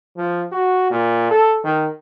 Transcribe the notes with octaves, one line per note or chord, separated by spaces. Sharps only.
F3
F#4
A#2
A4
D#3